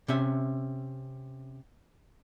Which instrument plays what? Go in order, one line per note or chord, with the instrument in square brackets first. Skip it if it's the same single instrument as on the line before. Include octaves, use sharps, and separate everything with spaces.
[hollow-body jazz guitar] C3 C#4 E5